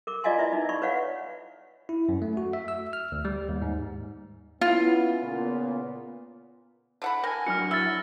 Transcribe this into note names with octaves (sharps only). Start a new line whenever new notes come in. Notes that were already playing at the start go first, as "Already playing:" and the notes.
A#4 D6
F4 D5 D#5 F5 G#5 C6
E4 B4 D5 E5
D#4
D5 B5 C#6
B4 C#5 F5 F#5
E4
F#2
A3
F#4
E5
E6
F6
D2
G3
D#2
G#2
B3 C#4 E4 F4
A#2 C#3 B3
D3 F#5 B5
A#4 G5 G#5 A#6
F#3 D4 F#4 F6 C#7
E4 E6 A6